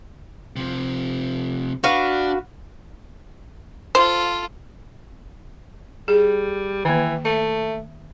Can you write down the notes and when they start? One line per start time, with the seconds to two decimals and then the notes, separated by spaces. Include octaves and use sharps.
0.56 C3 F3
1.84 D4 F#4 B4 F5
3.95 F4 A4 C5
6.08 G3 G#4
6.85 D#3 E3 A#3
7.25 A3 E5